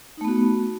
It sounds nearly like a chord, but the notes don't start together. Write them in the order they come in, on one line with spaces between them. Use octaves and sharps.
D#4 A3 B3 F#4